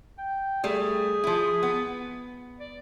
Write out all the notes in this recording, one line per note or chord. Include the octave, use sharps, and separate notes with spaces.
G5
G3 A3 G#4
F3 E4
B3
D5